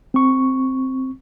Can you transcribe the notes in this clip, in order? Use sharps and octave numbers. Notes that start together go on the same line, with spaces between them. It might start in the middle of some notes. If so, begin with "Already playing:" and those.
C4 C#6